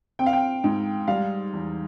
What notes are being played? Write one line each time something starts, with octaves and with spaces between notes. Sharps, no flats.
C4 G5
F5
G5
G#2
G3 F5
E2